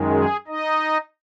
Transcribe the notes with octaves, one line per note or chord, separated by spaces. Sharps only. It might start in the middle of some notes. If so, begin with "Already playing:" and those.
Already playing: F#2 D#3 G#3
G#4
D#4 D#5